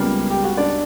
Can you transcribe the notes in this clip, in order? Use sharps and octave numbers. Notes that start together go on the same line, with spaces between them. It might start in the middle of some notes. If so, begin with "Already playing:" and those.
Already playing: C#2 C#3 G3 A#3 B3 A#4
G4
F#4
D4 D5